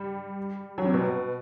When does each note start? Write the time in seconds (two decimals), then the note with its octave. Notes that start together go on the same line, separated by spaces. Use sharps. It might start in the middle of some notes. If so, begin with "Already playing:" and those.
Already playing: G3
0.78 F#3
0.85 C3
0.94 B2